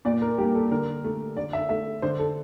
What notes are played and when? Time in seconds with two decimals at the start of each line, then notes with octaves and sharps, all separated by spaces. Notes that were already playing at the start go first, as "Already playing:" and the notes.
0.05 A#2 D5
0.22 A#4
0.38 G3 A#3 G4
0.55 A4
0.71 D3 A#4
1.04 A3
1.37 D3 D5
1.53 E5
1.69 A3 E5
2.02 D3 C5
2.19 A4